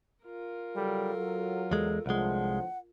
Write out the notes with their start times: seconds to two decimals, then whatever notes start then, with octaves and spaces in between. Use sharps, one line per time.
0.25 F4 A#4
0.75 C#3 F#3 G3 A4
1.14 F#3
1.71 E2 G#3 A4
2.06 C2 A2 D3 F3 G#3 F#5